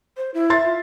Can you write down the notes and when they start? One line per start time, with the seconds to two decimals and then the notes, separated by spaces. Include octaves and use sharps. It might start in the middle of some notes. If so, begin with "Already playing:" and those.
0.17 C5
0.34 E4
0.50 E5 C6 A6
0.64 F4